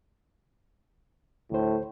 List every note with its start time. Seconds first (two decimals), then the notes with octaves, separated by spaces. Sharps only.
1.52 D2 A2 C5